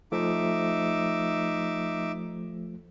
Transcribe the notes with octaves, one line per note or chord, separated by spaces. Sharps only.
F3 A3 D#4 E5 D6